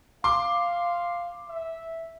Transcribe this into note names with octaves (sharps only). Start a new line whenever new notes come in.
F5 C6 D6
E5